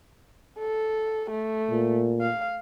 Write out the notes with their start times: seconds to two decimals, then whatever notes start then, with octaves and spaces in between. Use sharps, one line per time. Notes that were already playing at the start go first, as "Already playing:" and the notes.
0.59 A4
1.31 A3
1.70 A#2
2.21 F5